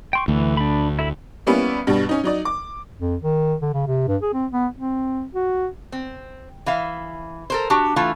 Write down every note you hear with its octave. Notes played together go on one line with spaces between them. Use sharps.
G5 C6 C#6
D2 E3
D4 B5
E4 A4 B5
G3 A#3 B3 C#4 E4
G2 B2 G3
C#4 D#4
F#3 D#4 D5
D6
F2
D#3
D3
C#3
C3
G2
G#4
C4
B3
C4
F#4
C4
E3 E5 F5
A4 A#4 C5
D4 F#4 G4
E3 A3 F4